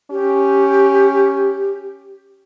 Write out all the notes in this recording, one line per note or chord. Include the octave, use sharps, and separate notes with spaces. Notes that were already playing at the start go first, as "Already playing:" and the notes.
C#4 G4